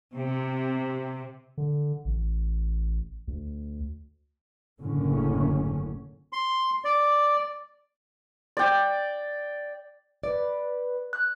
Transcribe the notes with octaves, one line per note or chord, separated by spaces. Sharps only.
C3
D3
A1
D2
F#1 D2 A2 D3 C#4
C6
D5
D5 G5
B4 D5
F#6